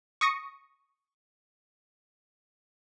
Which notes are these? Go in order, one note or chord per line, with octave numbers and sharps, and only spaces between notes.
C#6 D#6 A#6 C#7